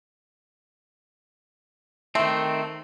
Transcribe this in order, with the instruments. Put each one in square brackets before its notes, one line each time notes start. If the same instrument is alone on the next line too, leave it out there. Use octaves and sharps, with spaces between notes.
[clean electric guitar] D#3 C4 [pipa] A3